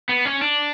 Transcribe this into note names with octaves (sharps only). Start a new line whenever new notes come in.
B3
C#4
D4